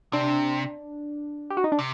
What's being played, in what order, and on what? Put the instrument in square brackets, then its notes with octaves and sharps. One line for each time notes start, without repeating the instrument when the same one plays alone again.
[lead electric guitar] C3 [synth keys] D4
[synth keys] G4
F#4
D#4
D4
[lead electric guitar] C3